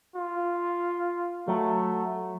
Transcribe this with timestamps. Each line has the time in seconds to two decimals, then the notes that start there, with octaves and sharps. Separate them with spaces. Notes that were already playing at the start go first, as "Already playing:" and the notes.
0.16 F4
1.48 F#3 A3